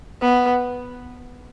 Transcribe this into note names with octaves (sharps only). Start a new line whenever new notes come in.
B3